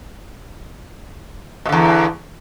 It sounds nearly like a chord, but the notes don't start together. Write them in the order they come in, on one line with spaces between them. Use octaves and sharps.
B2 D3 E2